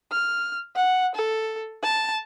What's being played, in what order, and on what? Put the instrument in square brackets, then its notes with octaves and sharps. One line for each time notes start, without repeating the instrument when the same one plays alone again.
[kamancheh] F6
F#5
A4
A5